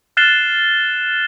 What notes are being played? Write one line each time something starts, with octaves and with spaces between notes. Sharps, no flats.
F6 F#6 A6 C7 E7 G7